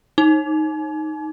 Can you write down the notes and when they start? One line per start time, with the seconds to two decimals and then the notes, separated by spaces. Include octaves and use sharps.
0.18 D#4